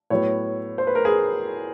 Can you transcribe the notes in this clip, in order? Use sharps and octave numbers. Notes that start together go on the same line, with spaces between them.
A2 F#3 B3 C#5
C5
B4
A#4
G#4